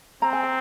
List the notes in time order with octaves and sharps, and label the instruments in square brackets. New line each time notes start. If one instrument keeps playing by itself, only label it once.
[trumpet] C4 [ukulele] A#5
[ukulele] G#5
G5